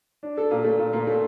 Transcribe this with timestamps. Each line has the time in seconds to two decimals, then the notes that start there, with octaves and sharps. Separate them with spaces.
0.23 D4
0.37 A4
0.51 A#2
0.64 A3
0.79 A#2
0.93 A#2
1.07 A3